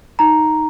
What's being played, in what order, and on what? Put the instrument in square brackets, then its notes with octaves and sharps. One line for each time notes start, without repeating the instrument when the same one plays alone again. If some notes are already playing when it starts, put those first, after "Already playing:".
[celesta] D#4 A#5